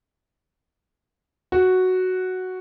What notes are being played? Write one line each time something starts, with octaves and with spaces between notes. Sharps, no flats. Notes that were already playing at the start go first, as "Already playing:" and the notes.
F#4